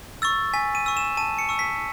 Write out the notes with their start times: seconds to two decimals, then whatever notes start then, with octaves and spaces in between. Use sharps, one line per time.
0.22 C#6 E6 A6
0.54 G#5 B6
0.75 D#7
0.86 C#6 E6
0.97 E7
1.17 A5 D#7
1.39 C#7
1.49 C#6 E6
1.59 B6